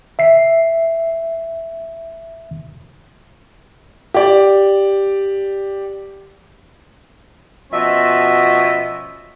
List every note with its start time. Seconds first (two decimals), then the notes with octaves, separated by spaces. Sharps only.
0.19 E5 C7
4.14 G4 D5
7.72 B2 F3 B3 C#4 D#5 E5